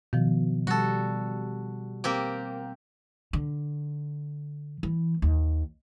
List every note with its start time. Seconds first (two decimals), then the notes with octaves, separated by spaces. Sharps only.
0.13 B2 D#3 F3
0.67 G3 F#4 A4
2.04 A#3 C4 G4
3.33 D3
4.83 E3
5.22 D#2